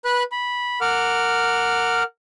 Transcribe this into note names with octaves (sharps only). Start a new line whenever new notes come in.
B4 B5 F#6
B5
A#4 F#5 D6 F6